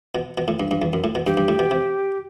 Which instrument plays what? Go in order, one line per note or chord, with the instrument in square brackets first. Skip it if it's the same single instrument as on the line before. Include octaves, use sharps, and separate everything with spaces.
[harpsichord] B2
B2
A2
G2
G2
E2
F#2
A2
B2
[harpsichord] G2 [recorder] G4
[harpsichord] G2
A2
B2
C3